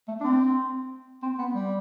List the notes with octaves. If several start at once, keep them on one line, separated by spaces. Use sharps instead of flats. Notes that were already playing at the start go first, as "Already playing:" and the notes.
A3
D4
C4
C4
B3
G3